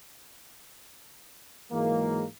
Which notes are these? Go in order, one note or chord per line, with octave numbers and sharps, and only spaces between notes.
G#2 E3 F#3 G#3 A#3